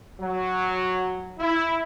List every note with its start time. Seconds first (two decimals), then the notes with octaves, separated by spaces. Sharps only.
0.20 F#3
1.39 E4